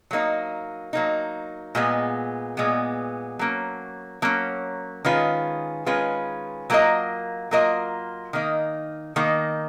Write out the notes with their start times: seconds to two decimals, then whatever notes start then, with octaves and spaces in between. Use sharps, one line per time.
0.11 F#3 A#3 D#4
0.93 F#3 A#3 D#4
1.75 A#2 G#3 B3
2.57 A#2 G#3 B3
3.39 F#3 A#3 C#4
4.22 F#3 A#3 C#4
5.05 D#3 G#3 C#4 F4 B4
5.86 D#3 G#3 C#4 F4 B4
6.70 F#3 A#3 F4 A#4 D#5
7.51 F#3 A#3 F4 A#4 D#5
8.33 D#3 A#3 D#4
9.16 D#3 A#3 D#4